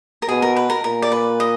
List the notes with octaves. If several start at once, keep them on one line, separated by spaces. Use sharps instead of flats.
A#4
B2 G#4
A#4
B4
A#4
A#2 A#4
D5
B4
D#5